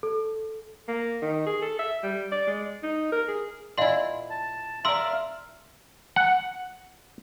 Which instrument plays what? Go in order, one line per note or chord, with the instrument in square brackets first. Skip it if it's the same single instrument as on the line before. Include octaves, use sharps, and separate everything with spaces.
[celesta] A4
[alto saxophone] A#3
D#3
G#4
A4
E5
G3
D5
G#3
D#4
A#4
G#4
[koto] A#2 E4 [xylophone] D#5 F5 C6
[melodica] A5
[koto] A#4 D5 [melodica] E5 F5 [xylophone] C6 E6
[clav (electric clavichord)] F#5